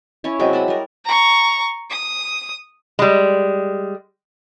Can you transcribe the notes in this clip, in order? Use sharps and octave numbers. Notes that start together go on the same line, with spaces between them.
C#4 E4 C#5
C3 F#3 G#3 G5
D5 E5 F#5 B5
G3 A#4
A#5 C#6
D#6
G3 G#3